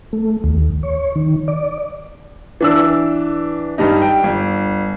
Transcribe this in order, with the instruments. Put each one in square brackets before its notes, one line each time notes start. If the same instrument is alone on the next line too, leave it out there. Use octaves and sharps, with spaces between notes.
[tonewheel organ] A3
D#2
C#5
D#3
D5
[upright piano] E3 D4 E6
G2 G3 D#4
G5
G1